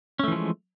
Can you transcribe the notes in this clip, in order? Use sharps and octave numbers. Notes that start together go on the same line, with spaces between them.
E3 F3 G#3 A3 C#4